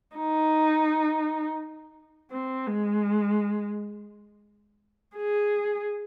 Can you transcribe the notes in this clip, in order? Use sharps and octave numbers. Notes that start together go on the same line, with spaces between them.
D#4
C4
G#3
G#4